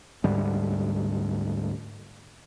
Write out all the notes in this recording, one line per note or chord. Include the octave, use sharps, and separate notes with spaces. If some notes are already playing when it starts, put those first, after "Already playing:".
D2 G#2 G3